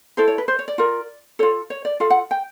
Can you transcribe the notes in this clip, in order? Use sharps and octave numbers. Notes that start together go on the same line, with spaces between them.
E4 A4 C5
C#5
B4
C5
C#5
D5
F4 A#4
F4 A4 C#5
C#5
D5
F4 A4 F5
F#5
G5